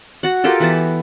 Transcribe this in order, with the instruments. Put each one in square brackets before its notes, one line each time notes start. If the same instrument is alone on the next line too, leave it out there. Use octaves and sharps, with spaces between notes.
[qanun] F#4 F#5
F4 G4 A4 A#4
E3 B3 A5